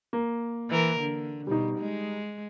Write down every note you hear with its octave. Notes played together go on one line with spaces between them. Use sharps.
A#3
E3 A#4
D3
B2 G3 D#4
G#3